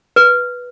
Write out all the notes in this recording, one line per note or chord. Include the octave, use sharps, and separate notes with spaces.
B4